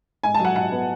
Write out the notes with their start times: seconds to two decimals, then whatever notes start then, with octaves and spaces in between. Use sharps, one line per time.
0.23 G#2 G#5
0.34 A5
0.40 F#3
0.45 F#5
0.56 G#2 F#5
0.72 B3